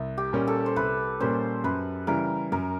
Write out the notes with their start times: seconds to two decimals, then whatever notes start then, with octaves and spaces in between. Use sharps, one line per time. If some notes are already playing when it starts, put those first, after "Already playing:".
Already playing: C2
0.18 G4
0.33 A#2 G3 A#3 C#4
0.47 A4
0.66 C5
0.76 C2 B4
1.20 A#2 G3 A#3 C#4 C5
1.64 F#2 B4
2.07 C#3 E3 G3 A#4
2.52 F#2 A#4